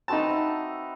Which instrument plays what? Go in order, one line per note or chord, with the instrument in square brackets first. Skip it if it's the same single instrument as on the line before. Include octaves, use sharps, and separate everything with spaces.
[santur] C4 F#4 B4 [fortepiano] D#4 A5
[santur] E5